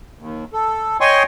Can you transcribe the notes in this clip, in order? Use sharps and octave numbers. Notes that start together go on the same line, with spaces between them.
D#2
A4
C#5 D#5 G5 G#5 C6 C#6